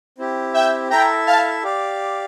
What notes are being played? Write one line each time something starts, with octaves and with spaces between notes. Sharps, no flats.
C4 E4 G4
E5 G5
E4 A4 E5 G5 A#5
F5 A5
G4 D5 F5